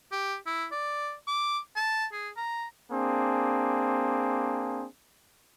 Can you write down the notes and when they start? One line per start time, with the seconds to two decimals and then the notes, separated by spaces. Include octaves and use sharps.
0.12 G4
0.47 E4
0.72 D5
1.27 D6
1.76 A5
2.13 G#4
2.37 A#5
2.92 A#3 C4 D4 G#4